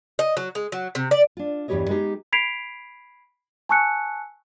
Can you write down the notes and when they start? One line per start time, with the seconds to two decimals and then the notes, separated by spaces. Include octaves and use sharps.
0.19 D#5
0.37 F#3
0.55 G#3
0.72 F#3
0.95 C3
1.11 D5
1.37 D4 F4
1.68 E2 G2 G3 G4 C#5 D#5
1.89 G#3 B3 D#4 G4 G#4
2.32 B5 G#6 B6 C7 D7 F7
3.69 G#5 A5 C#6 E6 F#6 C#7